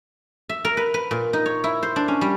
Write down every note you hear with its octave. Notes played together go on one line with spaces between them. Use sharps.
E5
A#4
B4
B4
A#2
D#4
C#5
E4
C5
D4
C#4
G3